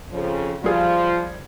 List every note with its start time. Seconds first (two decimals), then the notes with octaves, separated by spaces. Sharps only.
0.11 F2 C#3 F3
0.64 F3 G3 F4 G#4